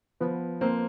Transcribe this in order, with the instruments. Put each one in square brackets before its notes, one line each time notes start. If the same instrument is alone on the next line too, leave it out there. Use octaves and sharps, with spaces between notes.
[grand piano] F3 [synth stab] B3 B4
[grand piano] A#3 [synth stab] C4 C5